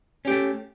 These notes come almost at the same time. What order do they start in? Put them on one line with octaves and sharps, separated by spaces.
C#4 G4 A3